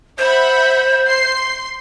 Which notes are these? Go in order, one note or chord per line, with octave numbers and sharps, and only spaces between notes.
C5 E5 F#5 B5
C6 C7